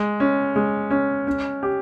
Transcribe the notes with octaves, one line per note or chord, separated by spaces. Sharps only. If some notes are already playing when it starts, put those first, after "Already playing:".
Already playing: G#3
C#4
G#3
C#4
C#4
G4